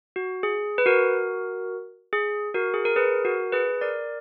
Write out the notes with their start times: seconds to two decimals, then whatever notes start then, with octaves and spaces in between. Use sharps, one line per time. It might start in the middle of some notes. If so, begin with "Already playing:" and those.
0.16 F#4
0.43 G#4
0.78 B4
0.86 F#4 A#4
2.13 G#4
2.54 F#4 A#4
2.74 G#4
2.85 A#4
2.96 G#4 B4
3.25 F#4 A#4
3.52 G#4 B4
3.81 A#4 D5